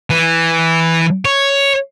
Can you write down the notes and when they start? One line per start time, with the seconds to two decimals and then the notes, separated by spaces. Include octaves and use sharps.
0.10 E3
1.25 C#5